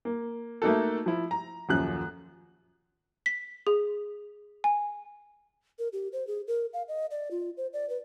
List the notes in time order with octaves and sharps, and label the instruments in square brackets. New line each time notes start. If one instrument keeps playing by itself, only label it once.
[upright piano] A#3
A3 A#3 D#4 F#4 A4
F3 E4
A#5
D#1 F#2 F3 F#6
[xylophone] B6
G#4
G#5
[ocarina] A#4
G4
C5
G#4
A#4
F5
D#5
D5
F4
C5
D5
B4